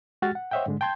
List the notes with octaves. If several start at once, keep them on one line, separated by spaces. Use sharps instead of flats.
G#3 F#4 G4 F#5 F6 A6
F#5
C5 C#5 D#5 E5 F#5 G5
G#2 D3 G#3
G5 A5 C6 G6 G#6